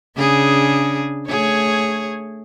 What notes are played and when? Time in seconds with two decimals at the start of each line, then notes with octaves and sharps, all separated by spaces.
0.17 C#3 D4 G#4
1.28 A3 G#4 C#5